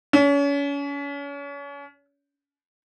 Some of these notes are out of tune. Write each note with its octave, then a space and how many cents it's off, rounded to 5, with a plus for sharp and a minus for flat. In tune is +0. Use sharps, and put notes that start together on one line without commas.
C#4 +35